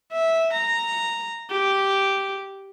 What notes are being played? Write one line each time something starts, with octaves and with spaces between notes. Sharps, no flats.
E5
A#5
G4